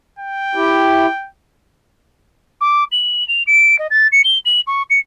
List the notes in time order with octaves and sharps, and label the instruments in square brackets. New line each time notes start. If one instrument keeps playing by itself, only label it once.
[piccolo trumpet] G5
[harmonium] E4 G4
[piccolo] D6
F#7
F7
D7
D#5
A6
C#7
G7
F#7
C#6
C#7